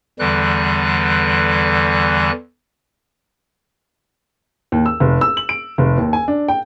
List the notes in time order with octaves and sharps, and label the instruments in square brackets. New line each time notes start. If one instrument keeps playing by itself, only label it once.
[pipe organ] E2 D3 E3 G3 F#6
[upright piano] D#2
E6
F1
E6
F#7
D7
F1
D#2
G#5
D4
G5